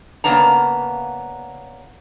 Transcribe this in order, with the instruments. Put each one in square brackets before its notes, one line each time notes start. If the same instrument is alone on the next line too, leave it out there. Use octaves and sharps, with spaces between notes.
[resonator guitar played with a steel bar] C#3 A#3 B3 D4 A#5